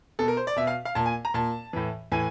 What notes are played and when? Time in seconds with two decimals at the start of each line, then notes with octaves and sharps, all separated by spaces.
0.19 B2 A4
0.28 A#4
0.37 C5
0.47 D5
0.56 B2 E5
0.67 F5
0.85 F5
0.95 A#2 A5
1.06 G#5
1.25 A#5
1.34 A#2 A5
1.73 A2 E3
2.12 A2 E3 G#5